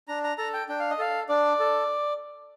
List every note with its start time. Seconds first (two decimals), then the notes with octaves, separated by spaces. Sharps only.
0.08 D4 A#5
0.24 A#5
0.38 A4 A#5
0.54 G5
0.69 D4 G5
0.79 F5
0.90 D#5
0.99 A4 F5
1.29 D4 D5
1.59 A4